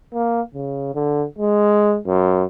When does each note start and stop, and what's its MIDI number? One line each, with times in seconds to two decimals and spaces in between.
0.14 0.41 58
0.55 0.92 49
0.95 1.25 50
1.39 1.98 56
2.07 2.44 42